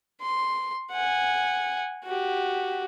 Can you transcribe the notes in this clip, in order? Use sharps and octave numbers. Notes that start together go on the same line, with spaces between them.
C6
F#5 G#5
F#4 G4